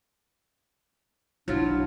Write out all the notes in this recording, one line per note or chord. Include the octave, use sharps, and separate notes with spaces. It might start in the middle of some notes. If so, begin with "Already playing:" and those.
B1 F#3 D4 E4 F4